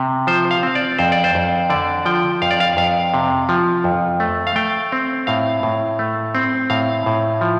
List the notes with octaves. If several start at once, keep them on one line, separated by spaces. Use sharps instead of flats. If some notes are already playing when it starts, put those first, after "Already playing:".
Already playing: C3
F3 C5
F5
C4
D5
F2 C5
D5
C5
F2
D3 D5
F3 G5
F2 F5
D5
F5
F2 F5
C3
F3
F2
A3
F5
A3 G5
C4
A2 F5
A2
A3
C4
A2 F5
A2
F3